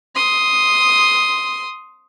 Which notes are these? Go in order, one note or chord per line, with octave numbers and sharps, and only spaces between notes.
C6 D#6